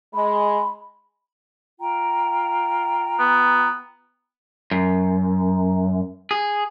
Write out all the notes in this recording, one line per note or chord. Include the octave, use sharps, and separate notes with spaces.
G#3 B5
F4 G5 A#5
B3
F#2
G#4